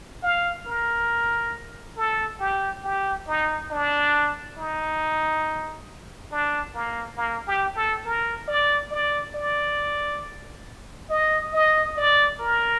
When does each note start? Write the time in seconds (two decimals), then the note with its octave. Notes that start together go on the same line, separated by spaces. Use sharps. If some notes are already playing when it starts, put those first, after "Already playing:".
0.23 F5
0.66 A#4
1.96 A4
2.40 G4
2.84 G4
3.27 D#4
3.71 D4
4.57 D#4
6.31 D4
6.74 A#3
7.17 A#3
7.47 G4
7.76 A4
8.05 A#4
8.48 D5
8.91 D5
9.35 D5
11.10 D#5
11.53 D#5
11.97 D5
12.39 A#4